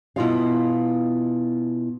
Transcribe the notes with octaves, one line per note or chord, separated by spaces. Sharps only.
B2 A3 E4 F4 D#5 F5